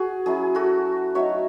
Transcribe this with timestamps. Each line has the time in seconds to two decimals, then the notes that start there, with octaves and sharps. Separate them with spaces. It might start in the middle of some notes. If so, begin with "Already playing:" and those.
Already playing: F#4 G#4
0.26 F#3 C#4 E4 G#4
0.55 F#4 A4
1.15 F#3 A3 D#4 C#5 E5